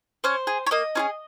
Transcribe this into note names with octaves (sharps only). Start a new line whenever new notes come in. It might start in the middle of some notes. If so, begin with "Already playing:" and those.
C#4 C5
G#4
C#5
A#3 D#5
C#4 F4 G#4